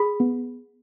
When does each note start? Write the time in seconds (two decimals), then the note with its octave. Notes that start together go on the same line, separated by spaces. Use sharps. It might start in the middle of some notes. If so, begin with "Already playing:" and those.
Already playing: G#4 B5
0.20 B3